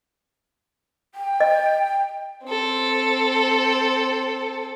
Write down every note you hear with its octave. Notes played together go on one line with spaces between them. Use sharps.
G5
D#5
C4 A4